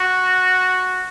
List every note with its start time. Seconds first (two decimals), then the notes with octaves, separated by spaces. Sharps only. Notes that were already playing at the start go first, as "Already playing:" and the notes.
Already playing: F#4